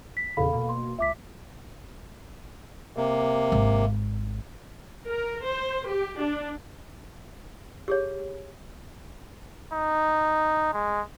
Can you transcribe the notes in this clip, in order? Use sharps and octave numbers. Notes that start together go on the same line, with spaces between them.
B6
E2 A#2 C#3 A4 F5 B5
B2 A#3
C6
C#2 E5 D6 B6
C3 A#3
G#1
A#4
C5
G4
D4
G4 G#4 C#5
D#4
G#3